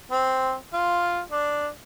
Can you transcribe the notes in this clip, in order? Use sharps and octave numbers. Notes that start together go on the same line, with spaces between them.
C4
F4
D4